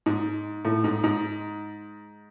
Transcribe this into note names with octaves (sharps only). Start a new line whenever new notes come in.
G#2
A2
G#2
G#2